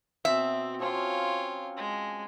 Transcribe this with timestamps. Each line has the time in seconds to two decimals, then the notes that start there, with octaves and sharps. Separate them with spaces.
0.25 B2 B3 C4 E5
0.80 F3 C4 C#4 F4 C#5
1.76 G#3